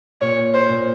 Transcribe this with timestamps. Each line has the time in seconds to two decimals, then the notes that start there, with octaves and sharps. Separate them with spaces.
0.21 A#2 C#5
0.54 C5
0.69 A#2